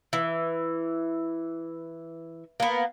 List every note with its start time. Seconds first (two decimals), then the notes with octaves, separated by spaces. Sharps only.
0.13 E3
2.60 A#3 B3